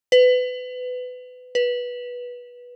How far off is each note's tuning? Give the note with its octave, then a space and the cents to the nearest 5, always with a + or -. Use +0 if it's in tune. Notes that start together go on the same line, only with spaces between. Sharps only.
B4 +25
B4 -15